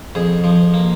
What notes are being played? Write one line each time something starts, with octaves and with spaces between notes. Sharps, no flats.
F2 G#4
F3
A#3